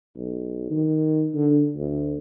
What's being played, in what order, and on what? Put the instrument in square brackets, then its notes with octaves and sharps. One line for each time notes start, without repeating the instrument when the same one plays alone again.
[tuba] B1
D#3
D3
D2